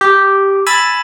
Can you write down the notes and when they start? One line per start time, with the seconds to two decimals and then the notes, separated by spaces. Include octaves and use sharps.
0.01 G4
0.66 G#5 B5 E6 A6